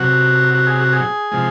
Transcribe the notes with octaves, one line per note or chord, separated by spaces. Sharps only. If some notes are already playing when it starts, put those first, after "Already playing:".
Already playing: C3 F#3 F#4
F#4
G#4
F#4
G#4
C3 F3 G#3